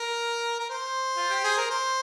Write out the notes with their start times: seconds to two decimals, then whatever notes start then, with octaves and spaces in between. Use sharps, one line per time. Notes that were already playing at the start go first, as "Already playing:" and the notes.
Already playing: A#4
0.59 A#4
0.70 C5
1.16 F4
1.30 G4
1.44 G#4
1.57 A#4
1.70 C5